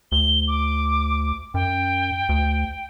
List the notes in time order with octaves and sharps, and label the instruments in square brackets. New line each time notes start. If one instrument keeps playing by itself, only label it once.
[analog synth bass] D2 [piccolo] G7
[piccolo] D6
[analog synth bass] F#2 [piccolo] G5
[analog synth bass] D2